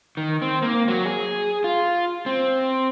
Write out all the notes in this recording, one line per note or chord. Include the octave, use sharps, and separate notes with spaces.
D#3
C4
A#3
F#3
G#4
F4
C4